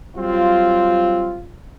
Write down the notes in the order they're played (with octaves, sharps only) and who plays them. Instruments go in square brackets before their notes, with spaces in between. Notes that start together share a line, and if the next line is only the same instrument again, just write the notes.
[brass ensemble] F#3 G3 C4 F4